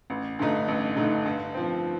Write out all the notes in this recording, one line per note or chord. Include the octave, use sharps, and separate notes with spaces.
A1
G2 D3 A3 D#4
A1
G2 D3 A3 D#4
G2
F3 C4